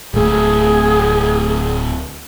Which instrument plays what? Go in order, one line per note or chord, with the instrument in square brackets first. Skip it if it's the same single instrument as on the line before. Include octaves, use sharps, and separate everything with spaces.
[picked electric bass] D1 A3 [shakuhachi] G#4